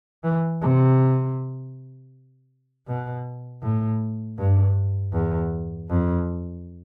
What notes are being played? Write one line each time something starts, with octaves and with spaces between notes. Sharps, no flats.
E3
C3
B2
A2
G2
E2
F2